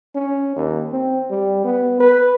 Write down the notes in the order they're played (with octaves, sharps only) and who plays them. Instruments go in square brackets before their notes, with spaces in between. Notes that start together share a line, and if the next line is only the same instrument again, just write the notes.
[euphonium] C#4
D#2
C4
G3
B3
B4